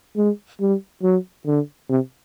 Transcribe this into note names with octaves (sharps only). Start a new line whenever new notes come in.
G#3
G3
F#3
D3
C3